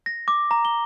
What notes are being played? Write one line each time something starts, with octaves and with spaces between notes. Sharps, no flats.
A#6
D6
A#5
G7